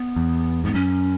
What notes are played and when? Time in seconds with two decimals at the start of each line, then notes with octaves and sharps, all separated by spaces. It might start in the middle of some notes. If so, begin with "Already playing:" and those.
Already playing: B3
0.16 E2
0.64 G#2 B3
0.74 F#2 C#4